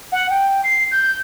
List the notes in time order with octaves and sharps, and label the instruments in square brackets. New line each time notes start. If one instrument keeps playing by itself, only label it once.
[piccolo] F#5
G5
C7
G6